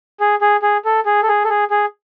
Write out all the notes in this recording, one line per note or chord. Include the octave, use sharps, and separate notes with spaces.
G#4
G#4
G#4
A4
G#4
A4
G#4
A4
G#4
G#4